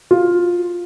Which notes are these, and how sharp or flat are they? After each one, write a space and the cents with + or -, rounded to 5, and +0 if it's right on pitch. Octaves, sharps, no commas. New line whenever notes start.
F4 +10